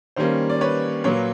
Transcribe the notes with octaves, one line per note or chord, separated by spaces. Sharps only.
D#3 G3 A#3 C#4 C5
D5
B4 C#5
A#2 F#3 A#3 B4 C#5